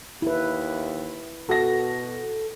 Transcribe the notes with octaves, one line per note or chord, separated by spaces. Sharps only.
D#2 E4 B4
B2 F#4 A4 A#6